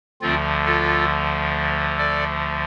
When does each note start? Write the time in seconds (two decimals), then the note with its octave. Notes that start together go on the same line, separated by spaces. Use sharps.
0.21 D2 D3 F3 C4 F4
0.65 F4 A4
1.98 A4 D5